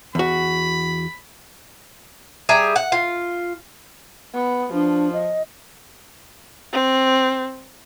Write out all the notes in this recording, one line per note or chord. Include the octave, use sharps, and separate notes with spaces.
E2 F#4 B5
G3 G#4 E5 A#5
F#5
F4
B3
F3 D4
D#5
C4